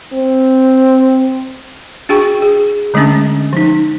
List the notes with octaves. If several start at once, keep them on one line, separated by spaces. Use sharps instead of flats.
C4
D4 F#4 G#4 G5 C#6
G#4
D3 G#3 A3 C#4 D4
F3 D#4